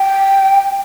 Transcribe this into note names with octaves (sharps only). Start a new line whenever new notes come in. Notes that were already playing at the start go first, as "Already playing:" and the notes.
Already playing: G5